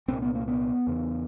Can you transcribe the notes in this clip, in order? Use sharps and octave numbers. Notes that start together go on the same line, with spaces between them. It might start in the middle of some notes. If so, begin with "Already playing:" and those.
C2 A#2 C4
B3
A#3
B3
E2 C#3